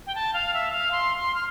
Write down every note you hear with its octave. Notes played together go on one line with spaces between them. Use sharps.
G5
A5
F5
E5
F5
C6
C6
F6